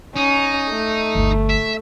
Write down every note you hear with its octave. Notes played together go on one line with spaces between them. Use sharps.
C#4 D#4
A3
G1 D2
E5